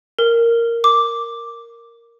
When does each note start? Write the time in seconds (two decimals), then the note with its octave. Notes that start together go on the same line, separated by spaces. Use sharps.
0.19 A#4
0.84 D6